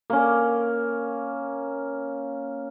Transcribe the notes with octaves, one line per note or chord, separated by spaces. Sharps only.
A#3 C#4